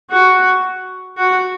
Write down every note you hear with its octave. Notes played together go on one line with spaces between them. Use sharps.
F#4
F#4